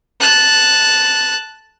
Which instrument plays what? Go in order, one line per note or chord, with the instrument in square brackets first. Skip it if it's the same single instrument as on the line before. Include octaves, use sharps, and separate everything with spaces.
[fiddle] A5 F#6